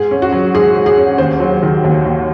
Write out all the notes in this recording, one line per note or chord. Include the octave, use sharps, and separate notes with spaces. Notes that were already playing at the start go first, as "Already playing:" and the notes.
Already playing: G#2 G#4
C#4
F#4
F#3
G#2 G#4
G#2
G#4
C#4
D#2 C5
F#3
D#3
D#2
D#2